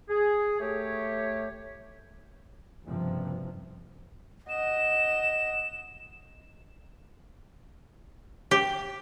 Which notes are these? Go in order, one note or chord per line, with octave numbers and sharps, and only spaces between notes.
G#4
A3 G4 C#5
F#1 G2 C3 F3
D#5 F#5 E7
G4